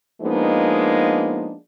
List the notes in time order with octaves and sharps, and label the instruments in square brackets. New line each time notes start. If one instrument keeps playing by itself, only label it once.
[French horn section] F3 G#3 A#3 B3 D4 D#4